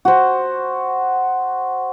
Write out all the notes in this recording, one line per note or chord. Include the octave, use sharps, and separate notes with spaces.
F#4 C5